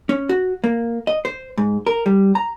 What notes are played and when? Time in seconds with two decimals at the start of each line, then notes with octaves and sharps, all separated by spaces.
0.09 C#4
0.29 F#4
0.64 A#3
1.07 D#5
1.25 C5
1.58 G#2
1.87 A#4
2.06 G3
2.35 A#5